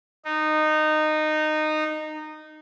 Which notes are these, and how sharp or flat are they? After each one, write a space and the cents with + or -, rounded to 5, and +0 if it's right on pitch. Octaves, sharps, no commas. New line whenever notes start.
D#4 -15